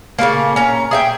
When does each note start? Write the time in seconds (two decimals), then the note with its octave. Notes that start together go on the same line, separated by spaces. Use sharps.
0.19 C#3 G3 A3 A#3
0.56 C#4 A#5
0.91 G#4 E5 G5